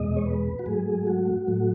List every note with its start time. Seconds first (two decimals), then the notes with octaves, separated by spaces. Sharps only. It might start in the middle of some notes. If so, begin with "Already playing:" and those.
Already playing: E2 B2 G#3 D#5
0.16 C#5
0.26 B4
0.59 F#4
0.66 G#2 F#3 A3 G#4
1.07 F#4
1.47 A2 F#3 A3